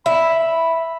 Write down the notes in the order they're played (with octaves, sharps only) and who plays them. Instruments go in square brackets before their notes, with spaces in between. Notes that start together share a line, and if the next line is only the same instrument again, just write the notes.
[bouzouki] E5 [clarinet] B5